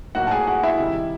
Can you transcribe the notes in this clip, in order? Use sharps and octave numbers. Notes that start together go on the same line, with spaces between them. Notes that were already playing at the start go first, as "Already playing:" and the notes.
A2 F#3 A#3 D#4 F#4 F#5
A5
G#4 G#5
F#4 F#5
E4 E5
C3 D#3 G3